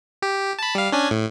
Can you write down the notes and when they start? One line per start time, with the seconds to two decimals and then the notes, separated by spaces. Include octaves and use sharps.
0.22 G4
0.59 A5 B5
0.75 G3 F5
0.92 C#4 D4 G#5
1.11 A2